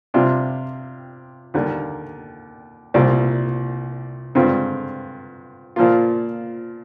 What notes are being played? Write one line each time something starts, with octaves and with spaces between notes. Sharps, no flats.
C3 G3 D4 F4
D#2 D3 G3 A#3
C2 A#2 G3
G2 D3 G#3 C4 F4
A#2 F3 A#3 F4